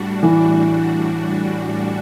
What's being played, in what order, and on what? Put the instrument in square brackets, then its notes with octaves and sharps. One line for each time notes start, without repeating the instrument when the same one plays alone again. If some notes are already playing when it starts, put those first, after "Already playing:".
Already playing: [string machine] A2 G3 D4 F#4
[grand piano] E3